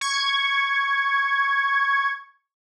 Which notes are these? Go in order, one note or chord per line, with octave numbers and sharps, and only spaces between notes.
C#6 G#6